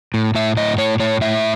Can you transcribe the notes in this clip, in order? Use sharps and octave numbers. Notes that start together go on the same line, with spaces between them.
A2
A2 E5
A2 D#5
A2 C#5
A2 C#5
A2 E5